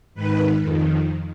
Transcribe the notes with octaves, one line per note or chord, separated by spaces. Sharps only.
G#2 D#3 B4
F2 D#3